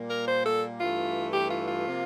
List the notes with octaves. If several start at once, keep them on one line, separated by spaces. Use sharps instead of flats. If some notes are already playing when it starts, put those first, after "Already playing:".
Already playing: A#2 G3 A#3
A#4
C5
A4
G2 E3 A3 F4
G4
F4
F4
C3 F3 A#3